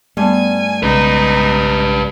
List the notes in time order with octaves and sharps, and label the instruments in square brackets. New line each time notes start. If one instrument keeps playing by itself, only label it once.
[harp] G2 B3 [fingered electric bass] A3 [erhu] G#5
[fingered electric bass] B1 C#3 G#3 [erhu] D#4 [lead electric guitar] G4 B4